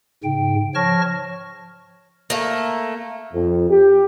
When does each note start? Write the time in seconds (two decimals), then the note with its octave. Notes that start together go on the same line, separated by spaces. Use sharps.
0.24 G#2 C#3 G5
0.75 F3 C#5 A5 C#6 F6 A#6
2.30 A3 A#3
3.33 F2
3.69 G4